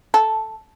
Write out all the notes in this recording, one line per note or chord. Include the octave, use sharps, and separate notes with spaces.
A4